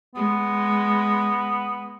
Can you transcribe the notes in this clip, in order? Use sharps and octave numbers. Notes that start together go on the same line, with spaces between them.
G#3 B3